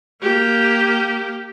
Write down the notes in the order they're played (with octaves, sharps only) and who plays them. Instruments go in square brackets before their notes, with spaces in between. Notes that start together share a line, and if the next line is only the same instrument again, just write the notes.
[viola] A#3 G4